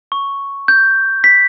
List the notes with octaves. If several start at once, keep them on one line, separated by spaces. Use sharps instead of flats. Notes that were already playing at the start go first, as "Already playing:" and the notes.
C#6
G6
B6